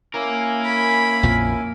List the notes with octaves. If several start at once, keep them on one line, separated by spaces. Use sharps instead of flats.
A#3 C#4 E4 A#4 G#5
B5
A#1 F2 F3